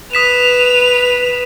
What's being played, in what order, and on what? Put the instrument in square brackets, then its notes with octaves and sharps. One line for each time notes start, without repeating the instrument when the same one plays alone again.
[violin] B4 F7 [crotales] D#6 B6 E7